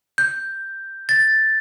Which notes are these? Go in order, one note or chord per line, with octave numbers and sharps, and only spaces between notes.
G6
A6